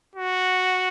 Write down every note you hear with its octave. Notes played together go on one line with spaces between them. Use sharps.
F#4